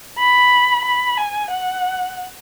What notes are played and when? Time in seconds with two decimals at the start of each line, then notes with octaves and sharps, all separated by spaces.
0.19 B5
0.85 B5
1.18 G#5
1.51 F#5